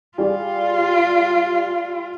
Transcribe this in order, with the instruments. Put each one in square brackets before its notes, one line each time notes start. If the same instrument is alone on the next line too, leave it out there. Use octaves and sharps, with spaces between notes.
[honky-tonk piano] G3 G#4 D5 [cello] F4